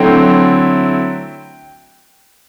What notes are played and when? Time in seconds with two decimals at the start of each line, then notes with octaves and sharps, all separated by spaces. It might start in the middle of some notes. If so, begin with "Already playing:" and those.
Already playing: D3 F#3 A3 C4 E4 G5